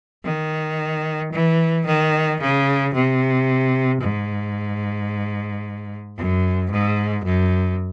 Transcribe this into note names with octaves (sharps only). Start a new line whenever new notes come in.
D#3
E3
D#3
C#3
C3
G#2
F#2
G#2
F#2